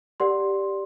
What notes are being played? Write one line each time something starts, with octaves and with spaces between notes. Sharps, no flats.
G4 A#4 D5 F#5 C6